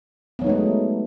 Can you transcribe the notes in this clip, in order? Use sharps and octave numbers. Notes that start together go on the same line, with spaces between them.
F#3 G#3 A3 B3 D#4